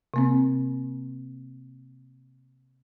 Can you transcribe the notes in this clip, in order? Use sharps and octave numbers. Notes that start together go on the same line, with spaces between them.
C3 A#3 C4